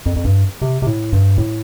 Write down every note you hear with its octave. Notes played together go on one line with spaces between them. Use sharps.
F2
F2
G2
C3
C3
A2
G2
A2